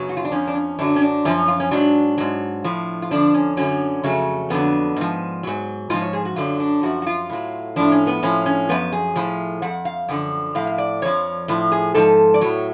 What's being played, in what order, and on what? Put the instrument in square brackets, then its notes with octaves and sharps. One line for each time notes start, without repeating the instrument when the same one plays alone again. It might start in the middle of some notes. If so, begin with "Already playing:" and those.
Already playing: [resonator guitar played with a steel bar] F#2 C#3 F#3 B3
F#4
F4
D4
F2 F3 C#4
D4
C#4
F#2 D3 F#3 D4
C#4
D4
F#2 F3 C#4
F4
C#4
G#2 F#3 D4
G#2 F#3
A2 F3
F4
F2 D3 F3 D4
C#4
F#2 D3 F#3 C#4
F2 C#3 F#3 A3
F2 D3 F#3 B3
G#2 F3
G#2 F#3
G#2 F3 F4
C#5
G#4
F#4
F#2 D3 F#3 F4
D4
F#2 F3 F#4
F#4
F4
A2 F#3
A2 F3 D4
C#4
B3
A2 F3 C#4
C#4
F#2 F3 B3
G#4
A2 F3
F2 F3 F#5
F5
F#2 D3 F3 F#5
A2 F3 F5
F5
D5
F2 F3 C#5
A2 F3
G#4
G#2 F3 A4
D5
A2 F#3 C#5